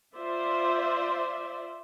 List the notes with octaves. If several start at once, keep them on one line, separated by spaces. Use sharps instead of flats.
F4 C5 D5 E5